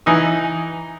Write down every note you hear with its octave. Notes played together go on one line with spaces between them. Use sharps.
E3 D#4 G#5 D#6